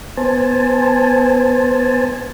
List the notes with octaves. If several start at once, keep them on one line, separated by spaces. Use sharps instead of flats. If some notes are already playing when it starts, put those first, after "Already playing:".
B3 C5 G#5 A5